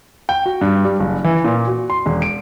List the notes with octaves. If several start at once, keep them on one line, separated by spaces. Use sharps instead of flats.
G5
F#4
G2
G3
F#1
E3
A#2
F#4
C6
E1
D7